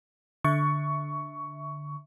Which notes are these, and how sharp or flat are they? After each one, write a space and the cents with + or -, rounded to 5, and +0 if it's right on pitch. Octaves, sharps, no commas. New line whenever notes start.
D3 +0 E5 -10 C#6 +15